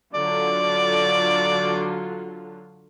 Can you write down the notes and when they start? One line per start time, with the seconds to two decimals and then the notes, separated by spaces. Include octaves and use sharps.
0.14 D3 F#3 F4 D5